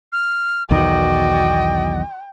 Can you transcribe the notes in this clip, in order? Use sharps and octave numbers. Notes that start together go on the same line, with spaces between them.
F6
B1 E2 D#3 F#4 D5 D#5 G5